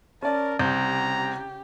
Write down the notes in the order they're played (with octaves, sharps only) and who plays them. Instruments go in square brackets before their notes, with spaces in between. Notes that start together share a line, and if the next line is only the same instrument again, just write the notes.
[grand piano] C#4 D5 [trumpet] A#4 [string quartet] A5
[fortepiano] C2 [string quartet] C#3 G4 [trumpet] A#5 [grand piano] G6